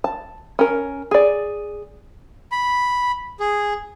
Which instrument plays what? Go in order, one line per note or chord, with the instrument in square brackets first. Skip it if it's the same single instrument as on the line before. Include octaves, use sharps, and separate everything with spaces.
[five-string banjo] A5
C#4 A#4
G#4 D5
[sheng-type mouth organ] B5
G#4